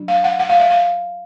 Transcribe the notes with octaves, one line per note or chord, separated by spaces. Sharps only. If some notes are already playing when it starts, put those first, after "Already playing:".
Already playing: F#3 D4
F5
F#5
F#5
F5
E5
F5